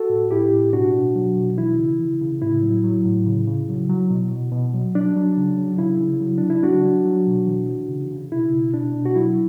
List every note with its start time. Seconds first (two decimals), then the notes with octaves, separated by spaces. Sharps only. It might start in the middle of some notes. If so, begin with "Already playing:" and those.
Already playing: F#4 A4
0.10 A2
0.31 A2 E4 G4
0.53 A2
0.73 B2 D4 F#4
0.94 B2
1.15 F#3
1.36 B2
1.58 E3 E4
1.79 C#3
1.99 E3
2.21 C#3
2.42 A2 E4
2.62 F#3
2.84 F#3
3.06 A2
3.27 C#3
3.47 C#3
3.69 F#3
3.90 F#3
4.11 B2
4.31 B2
4.52 B2
4.74 F#3
4.95 F#3 D4
5.16 F#3
5.37 C#3
5.58 F#3
5.78 C#3 E4
6.00 C#3
6.21 F#3
6.38 C#3 D4
6.50 E4
6.63 F#3 D4 F#4
6.85 F#3
7.05 F#3
7.27 B2
7.47 E3
7.69 E3
7.89 C#3
8.11 C#3
8.32 B2 E4
8.53 B2
8.73 B2 D4
8.96 B2
9.06 F#4
9.15 F#3 E4